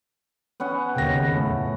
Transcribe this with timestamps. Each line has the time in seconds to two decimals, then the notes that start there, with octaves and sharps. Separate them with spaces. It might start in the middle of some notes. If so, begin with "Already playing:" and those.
0.60 B3 C#4 F#5
0.94 D#2 C#3 G5 A#6
1.35 F2 A2